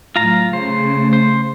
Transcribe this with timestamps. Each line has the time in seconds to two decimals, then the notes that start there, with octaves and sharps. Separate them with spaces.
0.16 A2 F#3 F4 F5 A#5
0.53 C#3 A3 C5
1.13 C5